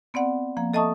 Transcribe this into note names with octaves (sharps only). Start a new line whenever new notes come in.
B3 C4 D5 F#5
F3 A#3
A4 D#5 E5 A5 C#6 D#6